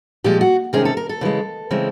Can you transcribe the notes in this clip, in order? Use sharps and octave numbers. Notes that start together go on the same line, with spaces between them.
A#2 F3 G#3 G4
F#4
C3 D#3 G#3 C#4 G#4
A4
A#4
A4
C#3 E3 G#3
C#3 E3 G#3 C4